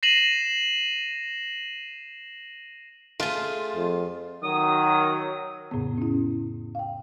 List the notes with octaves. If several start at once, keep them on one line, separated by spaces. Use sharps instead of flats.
A#6 C7 D#7 E7 F#7
A3 F4 G#4
F2
D#3 F#3 D#6
F2 A2 C#3 B3
C#4 E4
F5 G5